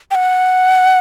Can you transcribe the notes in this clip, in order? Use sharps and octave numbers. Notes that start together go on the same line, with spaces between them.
G5
F#5